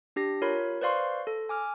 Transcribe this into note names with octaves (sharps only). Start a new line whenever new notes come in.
D4 G4 A#6
F4 A#4 C#5 B5
B4 C5 D5 F5 C6 C#6
A4
G#5 D6 F6